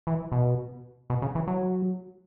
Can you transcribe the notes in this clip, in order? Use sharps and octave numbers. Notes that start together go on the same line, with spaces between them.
E3
B2
B2
C#3
E3
F#3